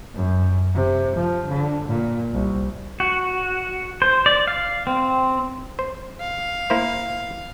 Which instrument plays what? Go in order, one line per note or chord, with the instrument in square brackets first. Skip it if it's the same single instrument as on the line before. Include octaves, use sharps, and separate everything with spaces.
[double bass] F#2
C3
F3
D3
A#2
C2
[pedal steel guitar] F#4
C5
D5
F5
C4
[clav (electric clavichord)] C5
[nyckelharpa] F5
[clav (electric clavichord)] A#3 E4 C5